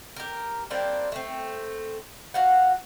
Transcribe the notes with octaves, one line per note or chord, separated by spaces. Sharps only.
G4 A#4
G3 A#3 C4 D4
A3 C4
F#4 F5 F#5